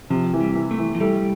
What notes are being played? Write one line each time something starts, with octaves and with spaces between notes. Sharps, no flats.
C3 F3
E3
G3
E3
A3
E3
F3
G3 A3